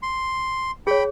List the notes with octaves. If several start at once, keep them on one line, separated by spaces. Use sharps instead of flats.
C6
G#4 C#5 G5 B5